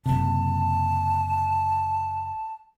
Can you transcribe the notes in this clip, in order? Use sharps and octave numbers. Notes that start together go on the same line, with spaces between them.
F#1 C3 A5